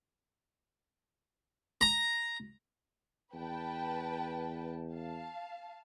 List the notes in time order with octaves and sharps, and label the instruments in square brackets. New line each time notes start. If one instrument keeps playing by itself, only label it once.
[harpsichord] A#5
[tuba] E2 [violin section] B4 G5 A5
[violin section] F5 A5